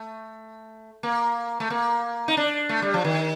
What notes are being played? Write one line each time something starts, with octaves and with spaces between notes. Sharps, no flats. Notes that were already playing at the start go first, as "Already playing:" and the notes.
Already playing: A3
A#3
A3
A#3
D#4
D4
A3
G3
F3
D#3